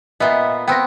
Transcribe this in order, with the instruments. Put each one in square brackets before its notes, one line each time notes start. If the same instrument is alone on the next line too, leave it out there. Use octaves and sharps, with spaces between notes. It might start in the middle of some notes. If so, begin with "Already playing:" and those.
[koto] A#2 B3 [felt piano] D#5 E5
[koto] B3 C4 [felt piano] G5 A#6